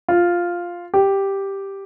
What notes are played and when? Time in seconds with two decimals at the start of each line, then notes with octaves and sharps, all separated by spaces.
0.08 F4
0.94 G4